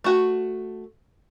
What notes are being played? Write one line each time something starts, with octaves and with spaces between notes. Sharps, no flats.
A3 F#4